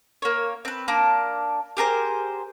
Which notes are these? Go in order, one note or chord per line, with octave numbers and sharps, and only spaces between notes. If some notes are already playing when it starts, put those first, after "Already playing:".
A#3 C#5
C4 B4
A#3 D4 D6
G4 G#4 A#4 C5